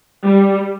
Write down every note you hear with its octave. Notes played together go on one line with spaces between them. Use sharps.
G3